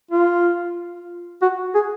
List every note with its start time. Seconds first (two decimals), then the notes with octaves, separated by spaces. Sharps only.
0.11 F4
1.42 F#4
1.75 G#4